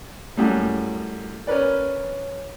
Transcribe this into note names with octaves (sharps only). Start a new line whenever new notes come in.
F#2 A2 G3 A3
C#4 A#4 B4 D5